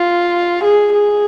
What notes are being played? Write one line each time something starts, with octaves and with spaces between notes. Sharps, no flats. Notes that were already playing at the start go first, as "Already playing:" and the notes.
Already playing: F4
G#4
G#4